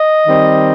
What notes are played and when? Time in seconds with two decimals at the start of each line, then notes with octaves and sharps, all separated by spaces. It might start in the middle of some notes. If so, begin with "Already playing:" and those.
Already playing: D#5
0.27 D#3 G3 C4